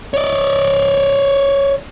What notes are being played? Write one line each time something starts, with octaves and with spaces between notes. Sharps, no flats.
C#5 D5